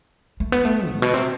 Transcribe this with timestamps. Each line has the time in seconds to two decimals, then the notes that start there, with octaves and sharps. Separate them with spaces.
0.40 A3
0.52 B3
0.65 A3
0.91 A2
1.02 B2
1.14 C3